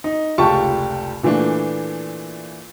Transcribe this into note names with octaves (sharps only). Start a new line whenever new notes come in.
D#4
F1 C#2 F4 G4 A5 C#6
A#2 E3 A3 D4